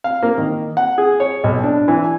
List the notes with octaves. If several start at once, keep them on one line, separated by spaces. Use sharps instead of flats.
F5
A#3
D#3
F#5
G#4
C#5
B1
D4
E3
G#5